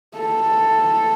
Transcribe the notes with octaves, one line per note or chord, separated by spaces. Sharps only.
A4